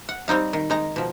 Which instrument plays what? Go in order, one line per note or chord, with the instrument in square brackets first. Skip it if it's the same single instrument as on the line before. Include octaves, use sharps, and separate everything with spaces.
[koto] F#5
G3 C4 D#4 F5
D#3
G#3 D#4 A#5
B2 F3